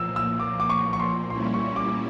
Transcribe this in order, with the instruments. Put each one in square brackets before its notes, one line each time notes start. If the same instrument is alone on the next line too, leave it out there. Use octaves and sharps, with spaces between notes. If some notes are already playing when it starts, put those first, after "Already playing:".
Already playing: [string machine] A#2 F3 A#3 [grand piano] E6
[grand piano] E6
D6
D6
C#6
C#6
C6
[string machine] A#2 G3 A#3 C#4 E4 [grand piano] C6
[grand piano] C#6
D6